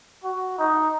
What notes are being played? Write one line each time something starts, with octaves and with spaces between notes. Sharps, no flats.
F#4
D#4